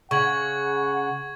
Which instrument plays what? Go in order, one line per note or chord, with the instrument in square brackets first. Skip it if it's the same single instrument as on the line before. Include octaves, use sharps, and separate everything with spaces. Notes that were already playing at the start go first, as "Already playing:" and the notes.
[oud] C#3 [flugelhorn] F#5 [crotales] C#6 G#6 F#7